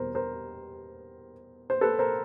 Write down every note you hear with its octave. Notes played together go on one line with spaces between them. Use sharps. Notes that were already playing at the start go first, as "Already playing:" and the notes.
Already playing: E2 B2 G3 B3 A#4 C5
A#4 C5
C5
A4 B4
A#4 C5